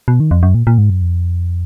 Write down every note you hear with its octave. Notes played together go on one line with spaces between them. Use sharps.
B2
D#3
F2
F#2
A#2
A#2
G#2
F#2
F2